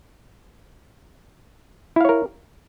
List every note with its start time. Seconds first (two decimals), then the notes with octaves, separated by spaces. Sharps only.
1.96 E4
2.01 F5
2.05 C#5
2.09 A#4